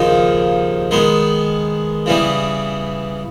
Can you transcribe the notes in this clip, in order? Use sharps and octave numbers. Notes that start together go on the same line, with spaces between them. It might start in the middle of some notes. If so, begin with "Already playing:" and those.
Already playing: D#2 C#3 F3 A#3 D#4
D#3 G#3 B3
C#3 E3 G3 B3